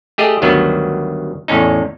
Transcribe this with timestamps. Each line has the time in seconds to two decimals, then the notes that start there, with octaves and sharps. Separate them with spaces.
0.18 A3 G4 G#4 D#5
0.42 D2 G2 D#3 F#3 B3
1.48 E2 A2 C#4 D#4